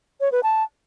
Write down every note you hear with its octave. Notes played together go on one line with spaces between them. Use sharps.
C#5
B4
A5